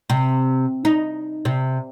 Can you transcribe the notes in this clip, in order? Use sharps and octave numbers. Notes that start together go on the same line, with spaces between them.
C3
D#4
C3